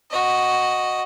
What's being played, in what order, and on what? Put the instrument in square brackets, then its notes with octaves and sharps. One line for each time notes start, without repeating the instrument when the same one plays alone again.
[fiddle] F#4 D#5